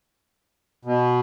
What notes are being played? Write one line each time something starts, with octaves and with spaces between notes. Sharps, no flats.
B2